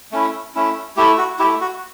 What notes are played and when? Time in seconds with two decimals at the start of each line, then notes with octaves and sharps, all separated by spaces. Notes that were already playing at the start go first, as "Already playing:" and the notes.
0.12 A3 C#4 E4
0.55 A3 C#4 E4
0.97 A3 E4 G4
1.18 F#4
1.39 E4 G4
1.43 A3
1.61 F#4